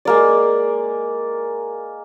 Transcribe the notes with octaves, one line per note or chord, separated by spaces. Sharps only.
G#3 A#3 D5